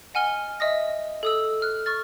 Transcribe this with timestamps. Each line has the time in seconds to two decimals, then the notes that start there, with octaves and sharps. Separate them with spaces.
0.14 D#5 F#5 G#5 F6 G7
0.60 D#5 E5 D#6 A#6
1.23 A4 D#6 E6
1.62 F6 F#6
1.86 C#6 F6 A6